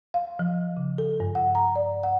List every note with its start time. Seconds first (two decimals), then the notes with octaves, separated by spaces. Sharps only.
0.14 F5
0.39 F3
0.77 C#3
0.98 A4
1.20 G2
1.35 F#5
1.55 A#5
1.76 D5
2.03 F#5